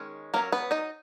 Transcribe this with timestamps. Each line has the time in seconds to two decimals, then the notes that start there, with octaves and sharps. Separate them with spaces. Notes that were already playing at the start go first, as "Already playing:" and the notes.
Already playing: D#3 G#3 C#4
0.34 F#3 A#3 C#4 A#4
0.52 B3 B4
0.71 D#4 D#5